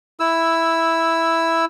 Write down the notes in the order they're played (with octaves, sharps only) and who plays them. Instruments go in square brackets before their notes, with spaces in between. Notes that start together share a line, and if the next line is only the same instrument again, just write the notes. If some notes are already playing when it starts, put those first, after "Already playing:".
[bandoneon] E4 E6